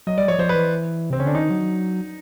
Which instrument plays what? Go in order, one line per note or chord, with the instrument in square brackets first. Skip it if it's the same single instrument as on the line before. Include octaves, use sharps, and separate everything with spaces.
[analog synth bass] F#3 [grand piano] D#5
[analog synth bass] G3 [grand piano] D5
[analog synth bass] F3 [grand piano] C#5
[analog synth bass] F3 [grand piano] C5
[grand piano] B4
[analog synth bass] E3
[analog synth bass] C3 [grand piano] C4
[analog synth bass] C#3 [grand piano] C#4
[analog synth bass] D3 [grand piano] D4
[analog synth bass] D#3 [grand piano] D#4
[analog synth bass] F#3